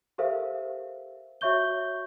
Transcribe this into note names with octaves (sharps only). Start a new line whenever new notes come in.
G4 A4 A#4 C5 E5 F5
F#4 C#5 E5 C#6 G6 G7